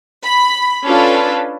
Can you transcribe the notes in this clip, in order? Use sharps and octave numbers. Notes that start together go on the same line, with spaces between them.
B5
C#4 D4 F4 A4 B4